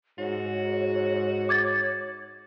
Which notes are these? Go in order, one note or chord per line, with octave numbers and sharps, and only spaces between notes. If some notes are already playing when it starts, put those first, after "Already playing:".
G#2 F#4 C#5
D6 G#6 A6